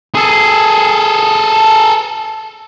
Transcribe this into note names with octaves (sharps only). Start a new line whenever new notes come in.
G#4 A4